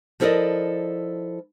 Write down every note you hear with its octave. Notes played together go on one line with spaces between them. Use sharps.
F3 E4 A4 A#4 D5 D#5